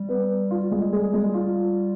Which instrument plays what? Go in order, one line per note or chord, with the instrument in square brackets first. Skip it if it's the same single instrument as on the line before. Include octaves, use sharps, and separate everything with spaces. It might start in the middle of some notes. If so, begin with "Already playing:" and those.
Already playing: [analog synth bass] G3
[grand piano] B3 B4
F4
G#3 G#4
G#3 G#4
G#3 G#4
F4